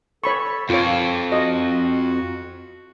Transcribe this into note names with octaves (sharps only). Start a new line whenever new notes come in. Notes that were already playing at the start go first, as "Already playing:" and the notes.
A4 C#5 B5 C#6
F2 F4 C#5 D6
F#4 D#5